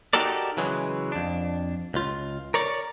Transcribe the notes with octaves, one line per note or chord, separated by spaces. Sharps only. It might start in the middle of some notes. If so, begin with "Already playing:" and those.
D#4 F#4 G4 A4 A#4 D5
C#3 E3 F#3 G#3
F2 D4
C#2 F4
A#4 C#5 D5